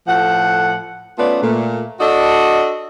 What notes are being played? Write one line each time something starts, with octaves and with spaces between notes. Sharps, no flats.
A2 F3 A4 F#5
A3 B3 C#4 F4 B4 D5
A#2 A3
D4 F#4 A4 D5 D#5